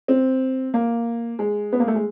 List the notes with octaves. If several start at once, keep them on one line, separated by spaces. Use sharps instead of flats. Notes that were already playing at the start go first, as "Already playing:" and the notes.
C4
A#3
G#3
B3
A#3
A3
G#3